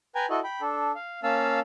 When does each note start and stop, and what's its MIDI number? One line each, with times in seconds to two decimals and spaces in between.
0.15 0.26 71
0.15 0.26 79
0.15 0.26 80
0.15 0.26 82
0.30 0.40 64
0.30 0.40 66
0.30 0.40 69
0.30 0.40 75
0.44 0.61 79
0.44 0.61 83
0.61 0.92 62
0.61 0.92 69
0.95 1.20 77
1.23 1.60 58
1.23 1.60 61
1.23 1.60 77
1.23 1.60 81
1.23 1.60 88